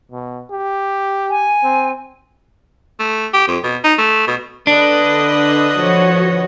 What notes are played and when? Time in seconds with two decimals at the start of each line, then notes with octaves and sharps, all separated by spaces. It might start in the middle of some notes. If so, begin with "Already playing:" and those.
0.11 B2
0.50 G4
1.30 G#5
1.63 C4
2.99 A3
3.34 G4
3.48 F2
3.64 B2
3.84 D#4
3.98 A3
4.27 B2
4.67 D3 D4 B4 D#5
5.75 F3 F#4 C#5